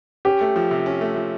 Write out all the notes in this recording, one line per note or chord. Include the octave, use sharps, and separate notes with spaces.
C#4 G4
A3
F3
C3
C#4
A3
F3